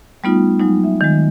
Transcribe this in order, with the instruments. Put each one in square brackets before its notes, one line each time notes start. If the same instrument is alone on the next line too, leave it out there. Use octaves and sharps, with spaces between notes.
[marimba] G3 A3 B3 D#4 F4
F#3 G#3 D#4
E5
D#3 G#3